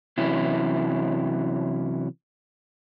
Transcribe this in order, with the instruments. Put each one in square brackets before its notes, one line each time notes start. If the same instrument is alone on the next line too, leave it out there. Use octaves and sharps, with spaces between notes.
[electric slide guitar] C3 E3 F#3 C#4 E4